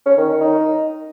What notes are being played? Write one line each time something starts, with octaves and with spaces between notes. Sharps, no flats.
C#4
D#3
D#3
D#4